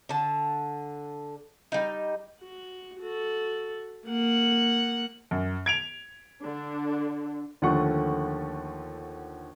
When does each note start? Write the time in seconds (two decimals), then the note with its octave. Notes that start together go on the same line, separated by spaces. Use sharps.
0.09 D3 A5
1.72 G3 D#4
2.41 F#4
3.00 F#4 A4
4.06 A#3 F#5
5.31 F#2
5.66 G#6 D7 F7
6.41 D3 D4
7.62 D#2 D3 F3 A3 F#5 C#6